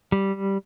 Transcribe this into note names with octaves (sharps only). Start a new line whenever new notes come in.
G3